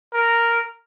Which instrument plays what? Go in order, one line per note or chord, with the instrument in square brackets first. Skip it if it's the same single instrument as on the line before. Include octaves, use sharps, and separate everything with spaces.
[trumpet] A#4